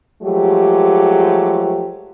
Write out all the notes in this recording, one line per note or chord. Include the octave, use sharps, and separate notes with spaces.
F3 F#3 G#3 A3 G4